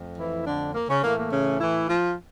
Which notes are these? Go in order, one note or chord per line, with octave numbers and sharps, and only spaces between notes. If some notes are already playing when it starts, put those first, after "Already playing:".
Already playing: F2 A3
E3 E4
D3 D4
A#3
C#3 C#4
A2 E3 A3 A#3
A#3
C#3 C#4
E3 E4
F3 F4